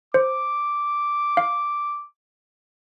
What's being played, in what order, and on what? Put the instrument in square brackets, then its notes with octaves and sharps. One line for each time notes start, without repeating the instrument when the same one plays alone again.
[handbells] C5 [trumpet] D6
[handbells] F5